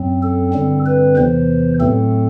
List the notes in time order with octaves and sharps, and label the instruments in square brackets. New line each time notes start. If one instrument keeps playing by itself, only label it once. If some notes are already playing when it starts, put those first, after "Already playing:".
Already playing: [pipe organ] F#2 F#3 C4
A4
G2 D3 G3 C4
B4
E2 C3 E3 C5
A2 F#3 A3 C4 A4